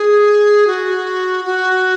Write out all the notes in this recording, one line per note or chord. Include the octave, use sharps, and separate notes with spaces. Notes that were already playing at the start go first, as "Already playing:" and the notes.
Already playing: G#4
F#4
F#4